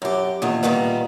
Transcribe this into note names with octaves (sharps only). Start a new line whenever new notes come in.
F#2 G4
E2 A#2 D#3
A#2 D#3 G3 B3